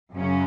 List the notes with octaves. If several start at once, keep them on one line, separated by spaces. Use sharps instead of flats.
F#2 C#3 F#3 C#4